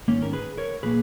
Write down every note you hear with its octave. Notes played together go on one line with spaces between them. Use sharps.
G#2 D#3 A#3 C#4
A#4
G#4 B4
A#4 C#5
A#2 F3 A#3 G#4 B4